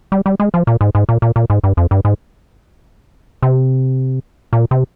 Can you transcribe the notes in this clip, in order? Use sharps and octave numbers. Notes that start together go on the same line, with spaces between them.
G3
G3
G#3
F3
A#2
G#2
G#2
A#2
A#2
A#2
G#2
G2
F2
G2
G#2
C3
A#2
C3